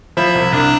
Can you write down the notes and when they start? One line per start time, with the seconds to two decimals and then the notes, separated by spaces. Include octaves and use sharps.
0.17 F3 E4
0.35 C2
0.53 C2 D4